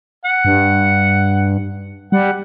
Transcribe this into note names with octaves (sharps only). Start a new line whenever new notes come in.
F#5
G2
G3 F#5